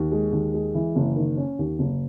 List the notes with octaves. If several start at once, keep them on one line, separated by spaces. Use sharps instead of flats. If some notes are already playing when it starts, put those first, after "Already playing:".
Already playing: D#2
G#3
D#2
G#3
E3
F#1
D#3
C#4
D#2
F#1